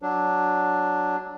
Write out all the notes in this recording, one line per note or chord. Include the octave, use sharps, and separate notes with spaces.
F#3 D4